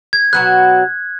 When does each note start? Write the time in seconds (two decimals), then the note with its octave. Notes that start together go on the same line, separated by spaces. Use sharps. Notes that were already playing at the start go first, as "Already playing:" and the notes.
0.13 G#6
0.33 B2 F#3 B3 F#4 F#6